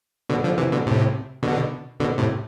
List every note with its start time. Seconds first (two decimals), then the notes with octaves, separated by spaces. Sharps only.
0.29 B2 D3
0.44 D3 F3
0.58 C3 E3
0.72 B2 D3
0.86 A2 C3
1.43 B2 D3
2.00 B2 D3
2.18 A2 C3